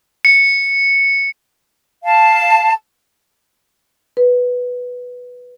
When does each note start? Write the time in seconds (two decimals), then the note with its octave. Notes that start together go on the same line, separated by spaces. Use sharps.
0.25 C#7
2.03 F5 A5
4.17 B4